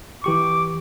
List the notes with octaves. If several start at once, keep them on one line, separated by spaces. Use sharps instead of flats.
E3 G4 C#6 D6